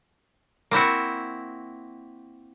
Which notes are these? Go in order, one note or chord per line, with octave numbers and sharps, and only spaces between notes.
A#3 C4 E4 F#4